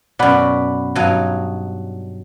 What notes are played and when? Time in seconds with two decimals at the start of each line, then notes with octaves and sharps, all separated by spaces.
0.19 F#2 B2 D5 F#5 B5
0.95 G2 F#3 D#4